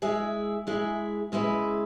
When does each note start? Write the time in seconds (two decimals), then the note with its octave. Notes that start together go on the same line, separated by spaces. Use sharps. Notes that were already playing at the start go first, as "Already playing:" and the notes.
0.02 G#3 E4 G#4 E5
0.67 G#3 E4 G#4 E5
1.32 C#3 G#3 E4 B4 E5